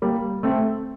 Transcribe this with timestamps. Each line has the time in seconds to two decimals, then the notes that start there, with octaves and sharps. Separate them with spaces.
0.02 G3 A#3
0.43 A3 C4